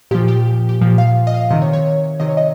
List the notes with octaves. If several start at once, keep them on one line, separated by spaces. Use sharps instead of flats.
A#2 F3 G4
G4
G4
A#2 F3
F5
D#5
F5
D#5
C3 D#3 D#5
C#5
C#5
C3 D#3 D#5
C#5
D#5